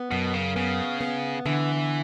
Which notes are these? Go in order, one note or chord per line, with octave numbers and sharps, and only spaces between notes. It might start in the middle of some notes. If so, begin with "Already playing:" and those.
Already playing: B3
F#2 B2
C#3
C#3 B3
B3
D3 E3